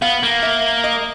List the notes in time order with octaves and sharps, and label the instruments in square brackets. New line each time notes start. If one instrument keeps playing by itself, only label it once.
[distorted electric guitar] B3 [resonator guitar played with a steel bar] F5
[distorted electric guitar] A#3
[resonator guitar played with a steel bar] E5
D#5